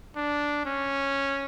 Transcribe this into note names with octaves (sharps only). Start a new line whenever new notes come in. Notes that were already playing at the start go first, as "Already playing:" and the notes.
D4
C#4